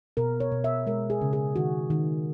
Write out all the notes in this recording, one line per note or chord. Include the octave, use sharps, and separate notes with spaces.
B2 A#4
C#5
B2
E5
G#3 A#4
G#4
C#3
G#4
D#3 F#4
D#3